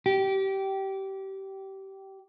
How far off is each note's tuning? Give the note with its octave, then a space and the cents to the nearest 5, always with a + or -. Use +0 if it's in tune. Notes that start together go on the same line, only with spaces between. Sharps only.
G4 -20